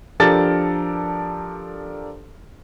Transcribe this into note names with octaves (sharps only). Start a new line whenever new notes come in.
F3 D4 G4 A4 A#4 A6